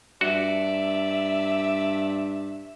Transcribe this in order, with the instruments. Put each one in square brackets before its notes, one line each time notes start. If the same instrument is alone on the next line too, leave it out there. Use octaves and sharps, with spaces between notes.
[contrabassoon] G2 [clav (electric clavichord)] F#4 [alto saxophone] D5 [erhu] E5